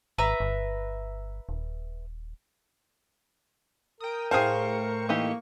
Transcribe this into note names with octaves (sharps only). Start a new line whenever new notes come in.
G#1 B4 E5 A#5
G1
D#1
A#4 G5 D#6
A2 G#4 C5 F5 G5 A5 C#6
E3 A#3 D#4 G4